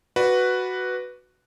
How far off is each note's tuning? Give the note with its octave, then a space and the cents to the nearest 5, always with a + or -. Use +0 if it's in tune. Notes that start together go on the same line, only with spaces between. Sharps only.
F#4 +0 B4 +0 D5 +0